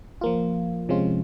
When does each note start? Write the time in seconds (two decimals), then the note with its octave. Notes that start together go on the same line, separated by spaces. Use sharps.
0.21 F3 A#3 F4
0.89 C3 F3 G#3 C#4 F4